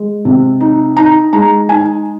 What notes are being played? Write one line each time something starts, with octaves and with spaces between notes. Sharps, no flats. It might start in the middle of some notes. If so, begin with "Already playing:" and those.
Already playing: G#3
C3
D#4
D#4 A#5
G#3 A#5
D#4 G#5